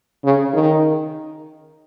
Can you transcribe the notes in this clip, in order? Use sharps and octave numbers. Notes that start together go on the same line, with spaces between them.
C#3
D#3